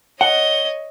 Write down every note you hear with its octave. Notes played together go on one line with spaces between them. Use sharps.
C#5 D#5 F#5 G7